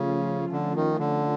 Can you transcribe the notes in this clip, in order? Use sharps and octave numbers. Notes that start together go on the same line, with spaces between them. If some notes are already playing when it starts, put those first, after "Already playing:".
Already playing: C#3 F3 A3 C#4 F4
D3
D#3
D3